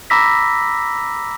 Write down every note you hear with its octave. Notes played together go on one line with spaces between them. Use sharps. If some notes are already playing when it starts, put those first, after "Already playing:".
A#5 B5 D6 E6 A#6 B6